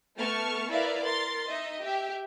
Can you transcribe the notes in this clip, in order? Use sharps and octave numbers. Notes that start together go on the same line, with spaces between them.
A3 B3 A5 C#6 F6
E4 A#4 B4 D5 E5 F5
A#4 C6 A6
D#4 D#5 E5
G4 E5